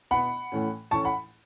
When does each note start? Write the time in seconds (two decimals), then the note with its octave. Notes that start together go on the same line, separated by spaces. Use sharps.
0.11 B2 B3 F#5 B5
0.52 A2 E3 A3 C#4
0.91 A2 E3 A3 C#4 A5 C#6
1.05 F#5 B5